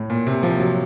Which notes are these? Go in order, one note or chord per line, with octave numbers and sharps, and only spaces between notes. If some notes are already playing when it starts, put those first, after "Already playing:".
Already playing: A2
A#2
C3
F3
F#3